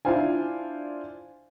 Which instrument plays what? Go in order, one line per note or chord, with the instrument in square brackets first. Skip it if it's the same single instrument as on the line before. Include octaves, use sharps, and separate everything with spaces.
[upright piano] D4 E4 F4 C5 F5 G#5